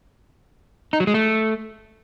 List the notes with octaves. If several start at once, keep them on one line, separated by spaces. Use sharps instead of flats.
D#4
F#3
G#3
A3